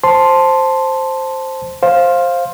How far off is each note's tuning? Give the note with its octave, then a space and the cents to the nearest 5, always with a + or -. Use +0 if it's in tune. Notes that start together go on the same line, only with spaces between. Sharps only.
C5 +5 A5 +0 C6 +0
C5 +15 F5 +0